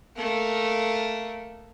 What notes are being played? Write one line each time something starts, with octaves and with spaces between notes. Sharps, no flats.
A3 A#3